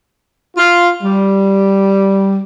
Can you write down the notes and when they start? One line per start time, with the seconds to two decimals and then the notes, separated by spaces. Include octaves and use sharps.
0.57 F4
1.03 G3